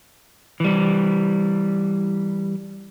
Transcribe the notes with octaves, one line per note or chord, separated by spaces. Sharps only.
E3 G3